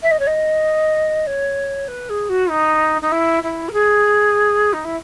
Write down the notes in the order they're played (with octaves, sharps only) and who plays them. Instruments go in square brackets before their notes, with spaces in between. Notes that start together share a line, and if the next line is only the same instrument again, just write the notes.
[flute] E5
D#5
C#5
D#5
C#5
B4
G#4
F#4
D#4
D#4
E4
E4
A#4
G#4
D#4
E4